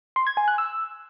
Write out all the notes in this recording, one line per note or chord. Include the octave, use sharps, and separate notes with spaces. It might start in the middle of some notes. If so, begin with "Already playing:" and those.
C6
G#6
G#5
F#6
E6